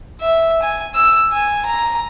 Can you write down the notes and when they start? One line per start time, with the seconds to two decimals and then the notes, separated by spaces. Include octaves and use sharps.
0.21 E5
0.62 G#5
0.95 E6
1.32 G#5
1.66 A#5